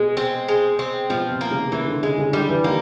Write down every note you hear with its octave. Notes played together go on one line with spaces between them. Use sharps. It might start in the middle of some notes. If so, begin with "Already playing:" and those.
Already playing: B2 G#3
C4
G#3
C4
B2 F3
C3
A#3
C#3
C#3 E3
D3
C#3 G#3
C#3
D3 G3
E3
D#3 A#3